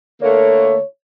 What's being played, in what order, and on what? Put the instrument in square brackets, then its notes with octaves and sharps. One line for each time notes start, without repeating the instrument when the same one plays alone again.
[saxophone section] D3 A3 A#3 [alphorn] C#5